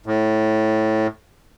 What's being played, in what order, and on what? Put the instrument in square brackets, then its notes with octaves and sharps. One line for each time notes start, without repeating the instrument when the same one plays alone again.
[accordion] A2